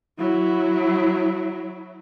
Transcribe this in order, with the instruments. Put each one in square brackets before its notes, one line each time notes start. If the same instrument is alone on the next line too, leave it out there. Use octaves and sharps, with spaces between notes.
[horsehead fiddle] F#3 E4